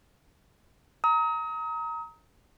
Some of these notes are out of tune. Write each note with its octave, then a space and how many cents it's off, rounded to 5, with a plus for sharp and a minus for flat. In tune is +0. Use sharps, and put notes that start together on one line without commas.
A#5 -5 D#6 +35